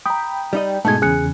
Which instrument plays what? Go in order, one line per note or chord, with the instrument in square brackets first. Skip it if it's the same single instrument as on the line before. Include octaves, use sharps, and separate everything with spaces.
[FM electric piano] G5 B5 [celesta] A#5 D#6
[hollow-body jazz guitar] G3 D#4 D#5
[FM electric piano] G#2 B2 G#4 [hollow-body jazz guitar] A3 D#4 [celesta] A5 G#6
[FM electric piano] E2 C#3 [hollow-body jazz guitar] G#4 [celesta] G#5 F#6 C#7